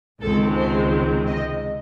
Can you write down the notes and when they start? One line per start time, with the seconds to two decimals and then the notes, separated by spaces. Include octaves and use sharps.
0.21 C#2 C3 D#3 G#3 C4 A4
0.56 C5
1.27 D#5